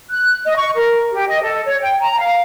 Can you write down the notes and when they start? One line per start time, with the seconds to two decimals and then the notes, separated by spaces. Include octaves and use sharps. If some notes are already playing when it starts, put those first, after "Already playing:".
0.10 F#6
0.45 D#5
0.57 C#6
0.75 A#4
1.12 G4
1.29 D#5
1.42 A4
1.66 C#5
1.80 G5
2.01 A#5
2.19 F5